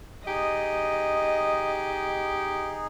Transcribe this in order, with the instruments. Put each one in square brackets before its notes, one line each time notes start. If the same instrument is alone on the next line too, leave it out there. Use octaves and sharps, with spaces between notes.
[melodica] D#4 G#4 [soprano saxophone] G4 [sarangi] D#5